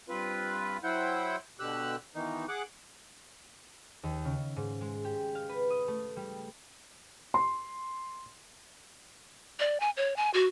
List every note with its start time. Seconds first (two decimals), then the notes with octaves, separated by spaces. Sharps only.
0.09 G2 C4 F4 B4
0.84 F#3 E4 C5 F#5 G5
1.60 B2 D3 G4 E6 F#6
2.15 B2 D#3 E3 D#4
2.49 G#4 F#5 D6 F#6
4.03 D#2
4.25 C#3
4.56 G#2
4.81 G#3
5.04 G4
5.35 F5
5.49 B4
5.70 D#6
5.88 A3
6.16 G3
7.34 C6
9.60 D5
9.80 G#5
9.97 C#5
10.16 G#5
10.34 F#4